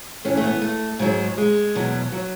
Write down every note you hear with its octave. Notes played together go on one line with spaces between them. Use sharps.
A2 E3 C#4
A3
B3
A3
G#2 F#3 G#3
G#3
E2 B2 F#3
F#3